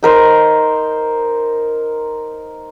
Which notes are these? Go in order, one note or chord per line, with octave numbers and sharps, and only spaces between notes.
D#4 A#4 C5